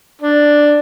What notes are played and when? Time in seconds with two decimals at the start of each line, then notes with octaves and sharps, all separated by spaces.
0.21 D4